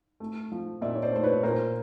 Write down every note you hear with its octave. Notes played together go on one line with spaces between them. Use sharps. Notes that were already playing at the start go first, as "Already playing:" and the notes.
A3
F3
A#2 D5 E5
C#5
C5 D5
A3 C5
B4 C#5
A#2 A#4 C5